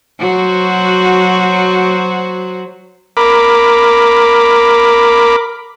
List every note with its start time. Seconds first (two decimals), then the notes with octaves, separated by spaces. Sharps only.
0.19 F#3 F#4 C5
3.17 A#4 B5 D6